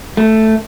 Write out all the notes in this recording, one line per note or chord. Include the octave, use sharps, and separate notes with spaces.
A3